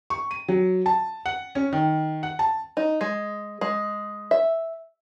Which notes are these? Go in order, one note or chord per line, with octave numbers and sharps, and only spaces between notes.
C#6
D#7
F#3
A5
F#5
C#4
D#3
F#5
A5
D#4
G#3
G#3
E5